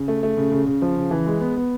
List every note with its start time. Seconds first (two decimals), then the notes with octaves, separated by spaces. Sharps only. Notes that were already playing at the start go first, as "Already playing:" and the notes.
Already playing: C#3
0.08 A3
0.23 A3
0.37 C#3
0.52 C#3
0.66 C#3
0.82 F3
0.97 C#3
1.11 E3
1.27 G#3
1.41 B3
1.56 B3